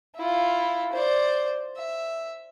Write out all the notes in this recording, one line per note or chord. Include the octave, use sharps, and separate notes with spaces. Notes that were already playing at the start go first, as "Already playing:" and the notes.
E4 F4
C5 D5
E5